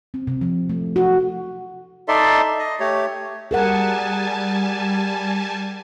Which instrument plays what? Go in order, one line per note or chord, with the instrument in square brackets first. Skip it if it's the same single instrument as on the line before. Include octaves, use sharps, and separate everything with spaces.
[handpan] C4
C3
F3
A3
F#4
[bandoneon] D#4 A4 D5 E5 C6
D#5
A3 G4 C#5
[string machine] G3 G#5 A5 [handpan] G#4 A#4 F#5